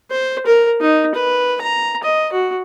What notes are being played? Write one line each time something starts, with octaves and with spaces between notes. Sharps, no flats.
C5
A#4
D#4
B4
A#5
D#5
F#4